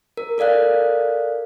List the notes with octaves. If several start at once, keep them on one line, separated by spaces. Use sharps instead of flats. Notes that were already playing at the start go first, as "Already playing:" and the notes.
A#4
A4 A#4 D5 F5 F#6